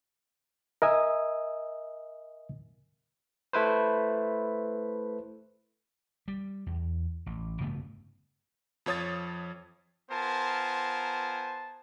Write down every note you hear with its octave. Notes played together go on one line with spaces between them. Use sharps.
A#4 D#5 E5 G#5 D#6 E6
A3 E4 B4 C5
G3
E2
A1
G2 C#3 A3 B3
F2 F3 C#5 D#6 A6
B3 F4 A#4 C5 G#5 A5